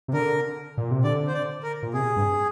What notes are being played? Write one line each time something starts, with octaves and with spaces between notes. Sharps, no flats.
C3
D3 A#4
A#2
C3
D3 D5
C5
D5
A#4
A#2
C3 G#4
G2